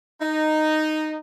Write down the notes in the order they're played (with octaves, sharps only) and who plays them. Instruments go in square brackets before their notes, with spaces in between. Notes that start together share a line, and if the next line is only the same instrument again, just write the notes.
[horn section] D#4